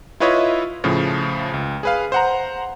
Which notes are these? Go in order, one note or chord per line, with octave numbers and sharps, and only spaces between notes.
E4 F4 B4 C#5 D#5 E5
A2 C#3 F3
C#2
G#4 B4 F5
C5 F#5 A#5